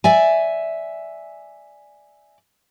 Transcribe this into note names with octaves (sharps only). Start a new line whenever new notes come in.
D5 E5 G#5